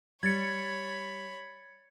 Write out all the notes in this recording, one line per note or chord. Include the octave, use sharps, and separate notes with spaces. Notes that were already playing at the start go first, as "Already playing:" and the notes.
G3 C#5 B5 G#6 A6 C#7